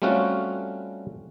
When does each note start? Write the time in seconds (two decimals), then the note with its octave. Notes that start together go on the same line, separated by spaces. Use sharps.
0.02 G3 A3 C4 C#4 F4 F#4